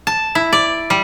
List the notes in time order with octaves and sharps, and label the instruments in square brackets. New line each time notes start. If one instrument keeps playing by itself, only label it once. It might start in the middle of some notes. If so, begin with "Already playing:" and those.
[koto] A5
E4
D5
G3